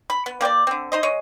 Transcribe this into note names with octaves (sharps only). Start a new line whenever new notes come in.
B5
B3
A#3 G4 C#5 D5
D3 C4
D#4 C5 D#5
G#3 C#5 D#5